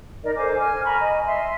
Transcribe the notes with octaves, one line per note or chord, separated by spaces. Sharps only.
D#4 A#4 D5 D#5
A4 C5 G#5 D6
G#5 F6
A#5 B5 C#6
D#5 G#5
E5 C6